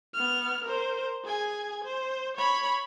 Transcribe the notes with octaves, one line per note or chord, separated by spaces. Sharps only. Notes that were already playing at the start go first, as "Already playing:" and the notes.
B3 F6
A#4 C5
G#4 G#5
C5
C#5 B5